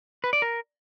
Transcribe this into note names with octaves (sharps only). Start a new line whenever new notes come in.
B4
D5
A#4